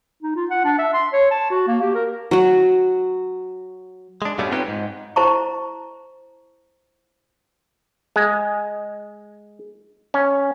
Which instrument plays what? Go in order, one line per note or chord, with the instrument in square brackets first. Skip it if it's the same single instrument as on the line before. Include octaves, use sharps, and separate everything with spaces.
[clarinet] D#4
F4
F#5
D4
E5
C6
C#5
A5
F#4
A#3
G4
A#4
[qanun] F#3 F#4
[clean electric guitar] G#3 D4
G2 B2 G3 A3 B3 C#4
C4 D#4 F4 G4 B4 C#5
G#2
[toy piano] E4 C5 A5 A#5 C#6
[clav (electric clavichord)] G#3
C#4